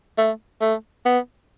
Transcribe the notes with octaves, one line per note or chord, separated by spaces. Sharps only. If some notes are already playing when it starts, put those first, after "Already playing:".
A3
A3
B3